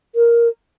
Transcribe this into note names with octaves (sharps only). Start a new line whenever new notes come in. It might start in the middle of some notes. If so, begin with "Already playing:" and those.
A#4